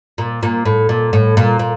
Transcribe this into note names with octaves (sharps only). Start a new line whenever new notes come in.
A#2
A#2
A2
A#2
A2
A#2
A#2